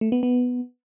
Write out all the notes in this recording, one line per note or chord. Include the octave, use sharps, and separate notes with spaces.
A3
B3
B3